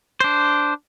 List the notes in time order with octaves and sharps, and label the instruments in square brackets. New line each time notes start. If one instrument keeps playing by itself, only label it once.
[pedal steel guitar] D4 C5